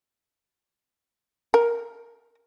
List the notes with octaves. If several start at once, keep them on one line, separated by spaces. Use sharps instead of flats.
A#4